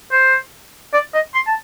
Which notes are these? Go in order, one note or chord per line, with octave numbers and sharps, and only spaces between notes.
C5
D5
D#5
C6
A5